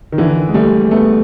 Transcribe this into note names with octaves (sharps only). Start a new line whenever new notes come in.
D#3
D3 E3
G#3
G3 A3
A3 B3